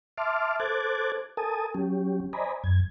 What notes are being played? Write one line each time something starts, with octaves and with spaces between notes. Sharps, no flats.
E5 A5 C6 D6 F6
A4 C5 D6 F#6 G#6 A6
A4 A#4 G#5 A5 D#6
F#3 C#4 G4
C5 D5 D#5 G#5 A#5 B5
F#2 G#6